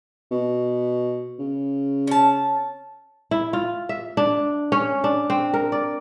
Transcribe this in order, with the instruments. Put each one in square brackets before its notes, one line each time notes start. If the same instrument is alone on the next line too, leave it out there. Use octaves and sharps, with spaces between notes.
[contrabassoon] B2
C#3
[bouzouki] C#4 A5
[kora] E4
F4
E5
D4
C#4
D4
C4
A#4
D5